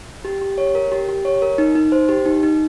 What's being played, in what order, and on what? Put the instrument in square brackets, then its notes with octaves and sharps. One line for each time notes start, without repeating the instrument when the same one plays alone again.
[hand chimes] G4
G4
C#5
A#4
G4
G4
C#5
A#4
D#4
D#4
C5
G4
D#4
D#4